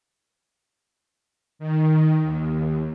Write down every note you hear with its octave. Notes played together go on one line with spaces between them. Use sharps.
D#3
D#2